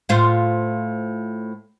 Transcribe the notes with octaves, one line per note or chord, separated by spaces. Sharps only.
A2 F4 C5